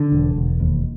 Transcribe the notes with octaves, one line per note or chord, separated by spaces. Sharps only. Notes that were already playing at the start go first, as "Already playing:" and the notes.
Already playing: D3
E1
E1
D#2